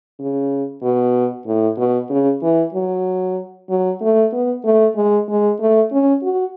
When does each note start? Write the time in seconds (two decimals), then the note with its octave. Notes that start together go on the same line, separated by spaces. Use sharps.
0.19 C#3
0.82 B2
1.46 A2
1.78 B2
2.10 C#3
2.42 E3
2.74 F#3
3.70 F#3
4.01 A3
4.32 B3
4.65 A3
4.96 G#3
5.28 G#3
5.60 A3
5.92 C#4
6.23 F#4